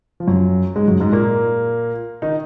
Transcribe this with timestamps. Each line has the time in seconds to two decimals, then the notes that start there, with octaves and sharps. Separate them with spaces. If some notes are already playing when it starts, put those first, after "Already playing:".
0.20 F3
0.28 F#2 F#3
0.76 G#2 G#3
0.88 F#2 F#3
1.00 G#2 G#3
1.12 A#2 A#3
2.22 D#3 D#4